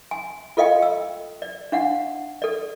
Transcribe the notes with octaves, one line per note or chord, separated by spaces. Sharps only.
G#5
F4 A4 D#5 F5 G5
E6
D5
D4 F5 F#5
A4 D5